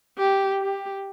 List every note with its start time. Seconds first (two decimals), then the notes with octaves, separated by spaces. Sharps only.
0.18 G4
0.60 G4